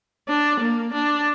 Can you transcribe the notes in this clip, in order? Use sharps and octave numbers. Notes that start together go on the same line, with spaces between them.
D4
A#3
D4